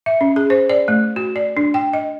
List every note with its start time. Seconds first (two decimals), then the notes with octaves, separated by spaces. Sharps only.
0.06 E5
0.21 C#4
0.36 G#4
0.50 C5
0.70 D5
0.88 A3
1.16 F#4
1.36 D5
1.57 D4
1.74 G5
1.93 D#5